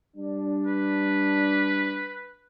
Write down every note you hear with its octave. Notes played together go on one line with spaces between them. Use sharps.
G3 D4
B4